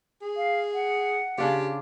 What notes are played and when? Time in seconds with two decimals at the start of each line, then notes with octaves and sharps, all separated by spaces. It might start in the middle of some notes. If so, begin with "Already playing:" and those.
0.22 G#4
0.36 F5
0.74 F#5
1.38 C#3 D4 F4 G4